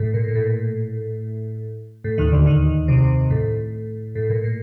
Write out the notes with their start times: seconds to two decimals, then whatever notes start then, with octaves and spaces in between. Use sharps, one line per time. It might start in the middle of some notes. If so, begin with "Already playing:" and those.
Already playing: A2
0.14 A#2
0.28 A#2
0.35 A2
2.04 A2
2.18 D#2 D#3
2.32 D2 D3
2.46 D#2 D#3
2.88 C2 C3
3.30 A2
4.15 A2
4.30 A#2
4.44 A#2